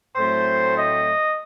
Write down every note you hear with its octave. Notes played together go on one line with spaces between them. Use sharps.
A2 F#3 A3 C4 C5
D#5